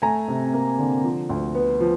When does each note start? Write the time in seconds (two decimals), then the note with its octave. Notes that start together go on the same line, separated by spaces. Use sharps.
0.02 A3 G#5 A#5
0.28 C3
0.53 A#3
0.79 D3
1.04 F3
1.29 D2
1.55 B3
1.80 F3